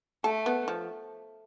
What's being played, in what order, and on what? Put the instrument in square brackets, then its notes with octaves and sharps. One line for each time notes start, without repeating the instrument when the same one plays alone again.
[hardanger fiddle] A3 [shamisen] A4
[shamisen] B3
F3